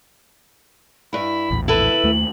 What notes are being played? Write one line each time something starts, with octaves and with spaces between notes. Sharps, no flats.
G2 E4 B5
A#1 E2 A2
E4 A4 B4 F#7
D#2 A3